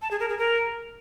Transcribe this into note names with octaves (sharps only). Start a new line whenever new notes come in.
A5
G#4
A#4
G#4
A#4